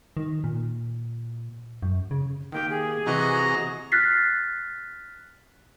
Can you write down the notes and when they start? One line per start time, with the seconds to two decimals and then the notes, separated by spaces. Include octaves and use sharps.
0.17 D#3
0.44 A#2
1.82 F#2
2.11 C#3
2.52 D#3 A#3 G4 G5
2.70 G#4
3.07 C3 E3 F#4 D#5 A#5
3.92 F6 F#6 A6 B6 C7